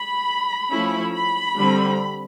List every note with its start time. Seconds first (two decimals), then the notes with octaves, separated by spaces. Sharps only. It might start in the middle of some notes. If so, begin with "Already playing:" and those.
Already playing: B5
0.72 F3 A3 C#4 E4
1.15 B5
1.57 D3 G3 C4